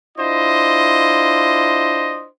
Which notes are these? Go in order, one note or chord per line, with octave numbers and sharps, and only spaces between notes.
D4 E4 F4 C5 D#5